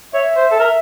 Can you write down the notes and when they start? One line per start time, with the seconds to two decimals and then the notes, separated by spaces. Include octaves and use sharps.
0.14 C#5 E5
0.36 C5
0.51 A4
0.60 A#4 E5